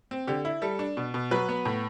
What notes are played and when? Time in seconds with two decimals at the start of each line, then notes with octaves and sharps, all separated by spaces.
0.11 C4
0.27 D3 G4
0.45 E4
0.62 G3 A4
0.79 D4
0.97 B2
1.14 B2
1.31 F#3 B4
1.49 B3
1.65 A2